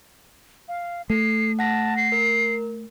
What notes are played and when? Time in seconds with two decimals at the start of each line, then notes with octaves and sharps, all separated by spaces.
0.68 F5
1.10 A3 A4 C7
1.59 F#5 A5 A#6 B6
1.97 C7
2.12 A#4